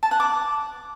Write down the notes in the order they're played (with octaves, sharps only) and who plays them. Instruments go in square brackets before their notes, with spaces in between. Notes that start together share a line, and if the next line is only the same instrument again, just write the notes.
[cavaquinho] A5
F#5
D6